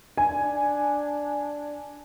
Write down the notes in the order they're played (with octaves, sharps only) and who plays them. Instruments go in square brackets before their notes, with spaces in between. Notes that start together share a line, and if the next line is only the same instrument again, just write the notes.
[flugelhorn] D4 [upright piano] G#5